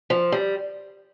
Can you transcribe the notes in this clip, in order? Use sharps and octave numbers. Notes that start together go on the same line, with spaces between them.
F3
G3